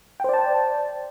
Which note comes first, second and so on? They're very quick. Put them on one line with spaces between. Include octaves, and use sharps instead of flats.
G5 C5 D5 A5